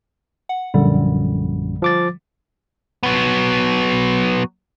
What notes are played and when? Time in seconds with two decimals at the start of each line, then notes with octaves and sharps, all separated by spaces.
0.49 F#5
0.74 A#1 F#2 D3 G3
1.82 F3 D6 A6
3.03 F#3 B3